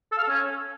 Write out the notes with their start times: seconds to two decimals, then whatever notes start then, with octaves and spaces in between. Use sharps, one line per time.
0.12 A4
0.17 F5
0.23 A4
0.29 C#4